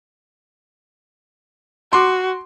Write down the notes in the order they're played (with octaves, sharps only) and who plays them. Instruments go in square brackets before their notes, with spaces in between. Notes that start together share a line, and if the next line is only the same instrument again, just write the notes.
[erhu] F#4 [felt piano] C6 D6